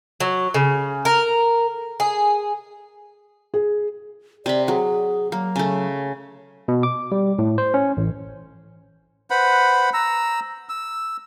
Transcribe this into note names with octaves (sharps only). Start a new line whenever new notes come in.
F#3
C#3
A#4
G#4
G#4
C3 D5 B5
F#3 G#4
F#3 A#3
C#3 A3
B2
D6
G3
A2
C5
C#4
A1
B4 C5 F#5 B5
A#5 E6
E6